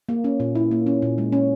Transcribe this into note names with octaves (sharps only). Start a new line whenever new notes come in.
A#3
C#4
A#2
E4
A#3
C#4
A#2
G#3
C#4